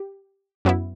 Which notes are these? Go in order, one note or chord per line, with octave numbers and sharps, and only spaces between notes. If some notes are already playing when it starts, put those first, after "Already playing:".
Already playing: G4
F#2 F#3 B3 E4